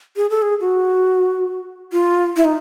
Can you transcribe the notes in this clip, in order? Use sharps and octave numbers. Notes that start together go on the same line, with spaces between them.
G#4
A4
G#4
F#4
F4
E4
D#4